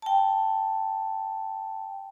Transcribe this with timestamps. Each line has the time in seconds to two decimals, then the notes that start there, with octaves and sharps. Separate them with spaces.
0.02 G5 A5